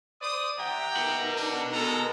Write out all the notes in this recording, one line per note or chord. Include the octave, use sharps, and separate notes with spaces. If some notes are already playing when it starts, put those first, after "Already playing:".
C5 D5 D#6
G4 E5 F#5 G5 A#5
D#4 F#4 A#4 B4
D4
G#3 B3 A4 A#4 A#5